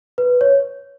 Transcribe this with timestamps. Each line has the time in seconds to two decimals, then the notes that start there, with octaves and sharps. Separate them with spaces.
0.18 B4
0.41 C#5